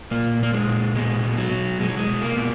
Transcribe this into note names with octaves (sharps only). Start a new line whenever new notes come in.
A#2 A#3
A#2 A#3
G#3
A#2
B2 G#3
B2
F#3
B2
B2 G#3
F#3
G#3
B2
A#3
B2